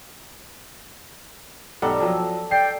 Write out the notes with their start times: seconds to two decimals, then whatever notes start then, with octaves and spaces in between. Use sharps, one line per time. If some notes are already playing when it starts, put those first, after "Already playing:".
1.82 B1 G3 A4 F#5 A#5 E6
2.00 F3 F#3 A4
2.51 D5 G5 C7